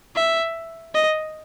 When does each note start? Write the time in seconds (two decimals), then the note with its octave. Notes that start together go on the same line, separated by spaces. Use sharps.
0.15 E5
0.94 D#5